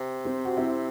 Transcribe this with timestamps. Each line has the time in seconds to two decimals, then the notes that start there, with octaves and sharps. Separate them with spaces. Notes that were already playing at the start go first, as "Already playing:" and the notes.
Already playing: C3
0.25 C4
0.45 F#4
0.57 C4 E4